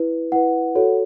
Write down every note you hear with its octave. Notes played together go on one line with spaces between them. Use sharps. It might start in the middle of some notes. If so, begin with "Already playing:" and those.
Already playing: E4 B4
E4 B4 F#5
F#4 A4 C#5